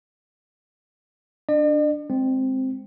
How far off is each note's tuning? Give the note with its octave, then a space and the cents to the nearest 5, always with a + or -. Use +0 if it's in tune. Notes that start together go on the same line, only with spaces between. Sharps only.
D4 +0 D5 +45
G#3 +0 C4 +0